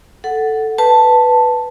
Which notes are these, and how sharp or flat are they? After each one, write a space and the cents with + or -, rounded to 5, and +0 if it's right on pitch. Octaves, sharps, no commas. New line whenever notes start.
A4 +0 F#5 +5
B4 +0 A5 +5